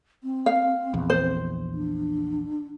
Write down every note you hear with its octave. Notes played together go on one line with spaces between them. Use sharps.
C4
F5
A#1 E2
C5
D4